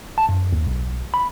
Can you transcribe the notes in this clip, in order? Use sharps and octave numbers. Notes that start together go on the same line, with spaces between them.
A5
F#2
D#2
B1
B5